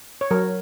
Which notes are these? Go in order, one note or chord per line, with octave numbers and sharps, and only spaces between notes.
C#5
F#3 A#4